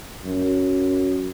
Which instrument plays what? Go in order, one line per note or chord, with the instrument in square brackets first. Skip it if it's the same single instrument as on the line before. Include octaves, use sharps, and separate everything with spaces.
[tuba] F#2